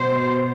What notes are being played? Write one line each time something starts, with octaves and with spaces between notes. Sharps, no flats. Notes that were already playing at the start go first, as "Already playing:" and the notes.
Already playing: B2 C5